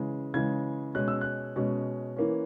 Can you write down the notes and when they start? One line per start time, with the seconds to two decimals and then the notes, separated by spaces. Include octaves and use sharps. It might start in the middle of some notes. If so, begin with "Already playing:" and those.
Already playing: C#3 E3 G#3
0.34 C#3 E3 G#3 G#6
0.95 B2 G#3 C#4 F#6
1.08 E6
1.21 F#6
1.56 B2 G#3 C#4
2.16 E3 A#3 C#4